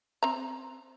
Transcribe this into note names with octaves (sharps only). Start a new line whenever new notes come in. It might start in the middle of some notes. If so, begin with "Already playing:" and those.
C4 A#5